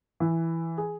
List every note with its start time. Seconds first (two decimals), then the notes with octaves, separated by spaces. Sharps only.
0.20 E3
0.78 G#4